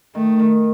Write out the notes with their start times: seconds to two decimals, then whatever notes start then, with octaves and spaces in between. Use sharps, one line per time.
0.15 D#3 A3
0.39 D#3